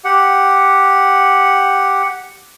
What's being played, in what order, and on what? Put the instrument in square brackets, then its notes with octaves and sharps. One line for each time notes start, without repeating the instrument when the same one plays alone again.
[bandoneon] G4 F#5